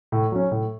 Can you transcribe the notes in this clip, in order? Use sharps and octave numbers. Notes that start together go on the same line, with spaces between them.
A2
F#3 C#4
A2